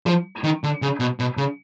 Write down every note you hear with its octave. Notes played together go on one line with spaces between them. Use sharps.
F3
D#3
D3
C#3
B2
B2
C#3